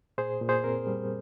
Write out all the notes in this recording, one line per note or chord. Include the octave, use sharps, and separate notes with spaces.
A#2 G#4 C5
A#2
G#4 C5
C4 A#4
G3